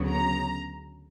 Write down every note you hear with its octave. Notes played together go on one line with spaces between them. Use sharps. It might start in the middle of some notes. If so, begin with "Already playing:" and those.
Already playing: D2 C#3 F#3 B3
A#5